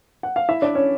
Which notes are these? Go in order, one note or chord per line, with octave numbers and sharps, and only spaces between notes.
F#5
F5
E4 E5
D4 D5
C#4 C#5